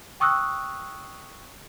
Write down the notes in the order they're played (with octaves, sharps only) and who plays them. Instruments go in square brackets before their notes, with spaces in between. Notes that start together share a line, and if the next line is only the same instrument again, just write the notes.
[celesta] G5 C#6 D#6 E6 F#6